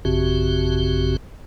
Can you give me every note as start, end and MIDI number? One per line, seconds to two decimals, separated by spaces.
0.05 1.16 33
0.05 1.16 42
0.05 1.16 49
0.05 1.16 60
0.05 1.16 66
0.05 1.16 67